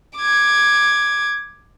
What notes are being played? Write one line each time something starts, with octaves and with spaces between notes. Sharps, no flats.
D6 G#6